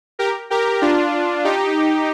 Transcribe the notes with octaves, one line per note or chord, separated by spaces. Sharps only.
G4 A#4
G4 A#4
D4 F4
D#4 G4